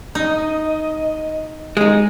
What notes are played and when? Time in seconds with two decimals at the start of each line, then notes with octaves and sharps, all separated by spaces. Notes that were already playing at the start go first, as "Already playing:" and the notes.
0.15 D#4 D#5
1.77 G#3 D#4